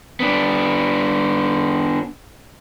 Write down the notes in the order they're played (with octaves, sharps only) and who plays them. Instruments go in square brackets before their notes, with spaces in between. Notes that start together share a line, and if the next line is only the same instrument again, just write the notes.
[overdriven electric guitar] B3 D4